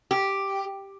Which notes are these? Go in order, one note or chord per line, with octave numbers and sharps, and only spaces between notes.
G4